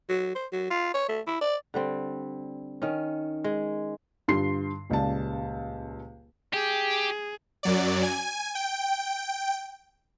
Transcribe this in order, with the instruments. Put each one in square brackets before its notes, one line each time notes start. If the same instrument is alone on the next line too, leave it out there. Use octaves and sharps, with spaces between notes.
[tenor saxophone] F#3
C5
F#3
F4
C#5
A3
E4
D5
[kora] D3 G3 C4
D#3 C#4
G#3
[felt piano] G2 D3 F4 C6 C7
D#1 C#2 C#3 D5 A5
[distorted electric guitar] G4 [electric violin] G#4
[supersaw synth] F#2 F#3 D5
G#5
G5